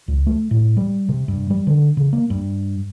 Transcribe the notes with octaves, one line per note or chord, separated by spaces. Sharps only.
C#2
A3
A2
G3
C3
G2
G3
D3
C#3
A#3
G2